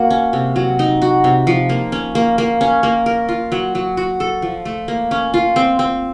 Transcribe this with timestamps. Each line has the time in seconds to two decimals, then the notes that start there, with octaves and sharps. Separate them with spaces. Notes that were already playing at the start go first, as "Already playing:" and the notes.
Already playing: A#3 F#4
0.10 C#4
0.33 C3
0.56 F#3
0.79 D#4
1.02 F#4
1.24 C3
1.47 F3
1.69 A#3
1.92 C#4
2.15 A#3
2.38 A#3
2.61 C#4
2.83 A#3
3.06 A#4
3.29 F4
3.52 F#3
3.75 F#3
3.97 F#4
4.20 A4
4.42 F3
4.65 A3
4.88 A#3
5.11 C#4
5.34 F4
5.56 C4
5.79 C4